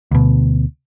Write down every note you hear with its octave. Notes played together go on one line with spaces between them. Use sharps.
D2 B2